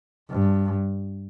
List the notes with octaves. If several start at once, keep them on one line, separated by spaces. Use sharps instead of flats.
G2